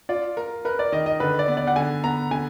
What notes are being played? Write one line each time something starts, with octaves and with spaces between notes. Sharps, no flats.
F4 D5
A#4
A#4 B4
D5
D#3 D#5
D#5
D3 B4
D5
B3
D5
F#5
D3 G#5
B3 A#5
D3 G#5